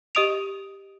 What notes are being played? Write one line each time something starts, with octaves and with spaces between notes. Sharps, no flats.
G4 D#5 D#6 D7 F7